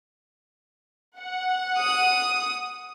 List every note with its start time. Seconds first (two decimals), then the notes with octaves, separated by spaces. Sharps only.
1.19 F#5
1.78 D#6